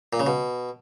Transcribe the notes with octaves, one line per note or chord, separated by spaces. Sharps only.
A#2
C#3
B2